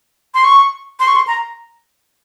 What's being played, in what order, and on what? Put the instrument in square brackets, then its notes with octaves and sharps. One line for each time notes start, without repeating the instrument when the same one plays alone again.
[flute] C6
C#6
C6
C#6
C6
A#5